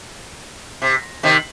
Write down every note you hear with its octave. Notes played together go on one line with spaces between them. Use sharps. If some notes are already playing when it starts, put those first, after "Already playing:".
C3
C3 D#3